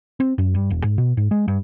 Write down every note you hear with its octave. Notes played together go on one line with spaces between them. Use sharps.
C4
F#2
G2
E1
G#2
B2
G#2
G#3
G2